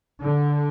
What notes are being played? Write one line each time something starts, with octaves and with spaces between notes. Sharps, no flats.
D3